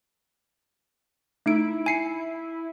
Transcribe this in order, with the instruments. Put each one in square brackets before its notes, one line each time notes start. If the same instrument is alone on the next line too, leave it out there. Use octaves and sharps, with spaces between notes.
[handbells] A3 D#4 D7 [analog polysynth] E4
[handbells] G#5 C7 C#7